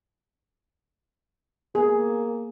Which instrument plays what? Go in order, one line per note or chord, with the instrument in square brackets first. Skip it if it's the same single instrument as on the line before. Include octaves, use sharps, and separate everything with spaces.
[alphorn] A#3 [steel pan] B3 G#4